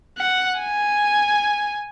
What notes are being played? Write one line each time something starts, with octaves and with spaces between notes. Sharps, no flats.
F#5
G#5